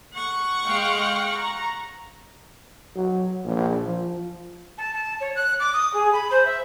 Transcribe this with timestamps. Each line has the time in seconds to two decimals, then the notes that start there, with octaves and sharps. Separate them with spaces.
0.14 F#5 C#6
0.66 G#3 F5 G5
1.36 A#5
2.96 F#3
3.44 A#1
3.85 F3
4.77 A5
4.93 A5
5.20 C#5
5.35 F#6
5.59 D6
5.73 D#6
5.93 G#4
6.12 B5
6.30 C5
6.45 E5